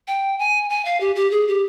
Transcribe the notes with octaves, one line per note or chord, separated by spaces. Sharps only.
G5
G#5
G#5
F5
G4
G4
G#4
G4